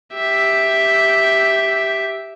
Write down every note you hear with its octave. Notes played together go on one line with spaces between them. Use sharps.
G4 E5